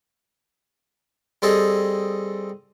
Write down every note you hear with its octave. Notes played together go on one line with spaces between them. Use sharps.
G3 C4 G#4 A4 D#5